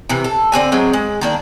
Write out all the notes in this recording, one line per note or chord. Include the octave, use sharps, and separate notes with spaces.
C3 E3
A4
D3 C4 F#4 G#5
F#3 G#3 C4
G#3
D#3 A#3 D4